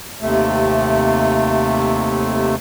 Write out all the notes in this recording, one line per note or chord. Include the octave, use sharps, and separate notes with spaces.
D#2 C3 A3